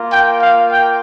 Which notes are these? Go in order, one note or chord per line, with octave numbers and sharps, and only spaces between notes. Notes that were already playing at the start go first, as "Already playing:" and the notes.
Already playing: A#3 F4
G5
F5
G5